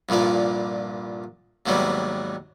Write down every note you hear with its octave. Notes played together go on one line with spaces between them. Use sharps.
C2 G2 A#2 F3 D5
D#2 G#2 C3 F#3 G3 B3